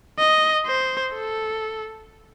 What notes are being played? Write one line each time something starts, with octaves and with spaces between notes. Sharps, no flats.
D#5
C5
A4